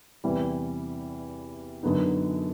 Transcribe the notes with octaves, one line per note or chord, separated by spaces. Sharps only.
E2 C3 E3 G3
F#2 D3 F#3 B3 D#4